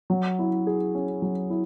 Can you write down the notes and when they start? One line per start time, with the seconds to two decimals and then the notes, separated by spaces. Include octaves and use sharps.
0.10 F#3
0.39 E4
0.67 G#4
0.95 C#4
1.22 F#3
1.50 E4